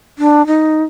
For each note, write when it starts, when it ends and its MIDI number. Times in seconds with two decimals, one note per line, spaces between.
0.19 0.45 62
0.47 0.84 63